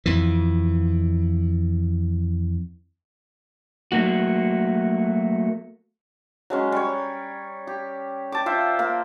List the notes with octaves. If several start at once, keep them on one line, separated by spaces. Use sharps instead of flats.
F2 E3
F#3 A3 A#3 F#4
F#3 G#3 C#4
G3 C#5
G4
G5 A5 D6
F4 C5 E5
A#3